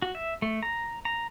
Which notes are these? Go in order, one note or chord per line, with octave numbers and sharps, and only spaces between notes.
F#4
E5
A3
A#5
A#5